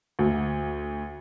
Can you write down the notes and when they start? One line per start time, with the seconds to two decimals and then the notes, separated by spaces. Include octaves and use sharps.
0.19 D2